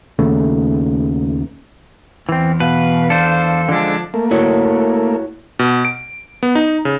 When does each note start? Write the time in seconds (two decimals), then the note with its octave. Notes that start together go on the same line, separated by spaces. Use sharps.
0.19 D#2 C#3 A3
2.29 E2 E3 C4
2.60 B2 B4 F5
3.10 D4 A4 C5
3.69 D3 F3 G#3 D4
4.14 A3 A#3
4.31 E4 F#4 C#5
5.59 B2
5.85 D7
6.43 B3
6.55 D#4
6.85 C#3